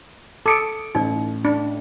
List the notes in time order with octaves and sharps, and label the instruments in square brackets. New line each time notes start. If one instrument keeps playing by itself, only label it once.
[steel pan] A4 [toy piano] D6 [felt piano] D#6 C#7 D7
[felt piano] A1 [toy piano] D#4 D5
[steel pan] D4